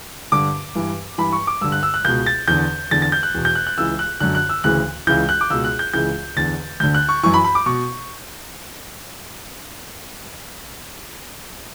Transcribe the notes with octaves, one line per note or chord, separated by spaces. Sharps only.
G2 D3 D6
G2 E3
G2 E3 B5
C#6
D6
G2 D3 E6
F#6
E6
F#6
C#2 B2 G6
A6
E2 D3 G6
E2 D3 A6
A6
G6
F#6
E2 B2
G6
F#6
F#6
C#2 C#3 E3 E6
F#6
F#2 D3 F#6
F#6
E6
D2 C#3 E3 F#6
C#2 C#3 E3 G6
F#6
D6
C#2 B2 E6
F#6
G6
C#2 C#3 E3 G6
E2 D3 A6
D2 D3 G6
F#6
C#6
F#2 E3 C#6
B5
B5
D6
B2 C#6